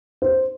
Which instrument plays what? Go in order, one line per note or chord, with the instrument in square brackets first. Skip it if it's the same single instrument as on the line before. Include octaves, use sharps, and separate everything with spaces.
[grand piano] C5